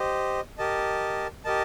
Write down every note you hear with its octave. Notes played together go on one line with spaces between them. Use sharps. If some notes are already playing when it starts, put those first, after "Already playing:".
Already playing: G4 C5 D#5
G4 A#4 D#5 A5
G4 A#4 D#5 A5